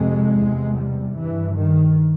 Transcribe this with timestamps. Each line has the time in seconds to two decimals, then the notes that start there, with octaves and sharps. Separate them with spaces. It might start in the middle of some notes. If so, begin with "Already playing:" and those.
Already playing: F2 C3 G#3
0.42 E2 C3
0.80 G3
1.17 G2 E3
1.55 D#3